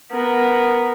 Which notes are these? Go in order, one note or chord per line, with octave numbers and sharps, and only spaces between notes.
B3 A#4